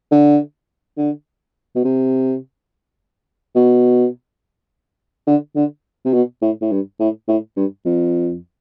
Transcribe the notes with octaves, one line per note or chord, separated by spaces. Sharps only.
D3
D3
B2
C3
B2
D3
D3
C3
B2
A2
A2
G2
A2
A2
G2
F2